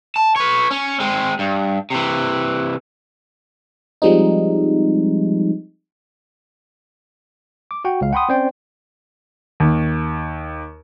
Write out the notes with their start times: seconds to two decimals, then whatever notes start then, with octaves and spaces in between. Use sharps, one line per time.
0.16 A5
0.36 B4 C#5
0.71 C#4
1.00 G#3 C4
1.39 G2
1.90 C3 E3
4.02 F3 G3 G#3 C4 D#4
7.71 D6
7.85 F#4 F#5 G5
8.01 C#2 F5
8.13 F#5 G5 B5 C6 D#6
8.29 C4 C#4 C5 D5 G5
9.60 D#2